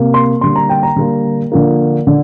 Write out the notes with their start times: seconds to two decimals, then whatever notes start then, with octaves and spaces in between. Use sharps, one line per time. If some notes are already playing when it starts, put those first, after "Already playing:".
Already playing: C3 A#3
0.14 C6
0.41 D3 G3 A#3 C6
0.56 A#5
0.69 G5
0.83 A#5
0.96 D3 G3 A#3
1.52 D3 F3 A#3
2.07 D3